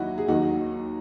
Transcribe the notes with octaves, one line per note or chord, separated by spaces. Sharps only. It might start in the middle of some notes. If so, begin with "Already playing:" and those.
Already playing: D#2 F#3 D#4 E4 F#4
G#4
D#2 D#3 F#3 D#4 F#4